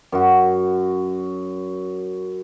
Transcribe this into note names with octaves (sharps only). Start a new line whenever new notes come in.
F#2 F#4